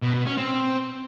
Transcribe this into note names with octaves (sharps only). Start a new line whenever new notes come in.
B2
B2
C#4
C4